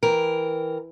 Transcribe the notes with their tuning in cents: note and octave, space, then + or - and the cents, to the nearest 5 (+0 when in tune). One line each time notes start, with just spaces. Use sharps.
E3 +0 A#4 +0 G5 +0